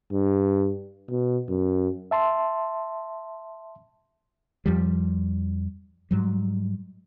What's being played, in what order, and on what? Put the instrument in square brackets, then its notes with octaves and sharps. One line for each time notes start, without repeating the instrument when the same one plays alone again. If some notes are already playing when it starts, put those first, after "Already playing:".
[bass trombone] G2
B2
F#2
[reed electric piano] E5 A5 C6
[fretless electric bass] F2 F3 G3
G#2 F#3 G3